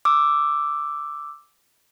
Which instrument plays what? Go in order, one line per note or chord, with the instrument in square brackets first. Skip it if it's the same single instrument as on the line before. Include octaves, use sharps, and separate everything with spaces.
[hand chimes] D6 E6